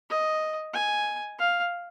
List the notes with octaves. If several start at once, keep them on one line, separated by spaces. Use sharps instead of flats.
D#5
G#5
F5